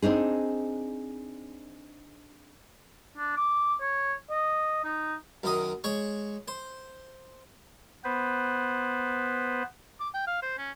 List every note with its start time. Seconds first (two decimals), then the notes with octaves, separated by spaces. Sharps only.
0.02 C4 D4 D#4 G#4
3.18 D4
3.36 D6
3.81 C#5
4.30 D#5
4.84 D#4
5.43 F#2 D#3 D#5 D#6
5.84 G#3 C#5 C#6
6.48 C5
8.04 B3 B4 C5
10.00 D6
10.14 G5
10.27 F5
10.42 C5
10.58 C#4